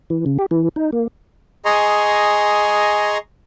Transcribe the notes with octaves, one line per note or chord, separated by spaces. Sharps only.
E3
C#3
G4
E3
D#4
A#3
G#4 D#5 G#5 A#5 C6 C#6